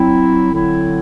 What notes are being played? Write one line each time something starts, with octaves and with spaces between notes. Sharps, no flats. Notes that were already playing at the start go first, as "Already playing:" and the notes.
Already playing: F#3 C4 E4
D3 F#3 C4 E4